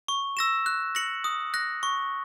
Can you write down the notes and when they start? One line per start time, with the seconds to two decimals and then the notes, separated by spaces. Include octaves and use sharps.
0.08 C#6
0.37 E6 A#6 E7
0.66 F#6
0.95 A#6 C#7 F#7
1.24 D#6
1.54 F#6 A#6
1.83 C#6